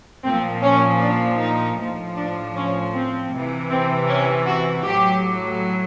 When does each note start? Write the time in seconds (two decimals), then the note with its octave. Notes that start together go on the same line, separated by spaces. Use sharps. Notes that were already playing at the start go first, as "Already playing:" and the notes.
0.24 A#2 F3 C4
0.63 C#4
1.01 D4
1.39 D#4
1.78 A2 F3
2.16 D4
2.56 C#4
2.94 C4
3.32 C3 E3
3.71 C4
4.09 C#4
4.47 F#4
4.86 A2 F#3 G4